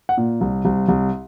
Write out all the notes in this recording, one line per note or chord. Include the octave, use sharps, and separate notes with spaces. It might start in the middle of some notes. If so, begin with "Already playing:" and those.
F#5
A#2
C2
C2
C2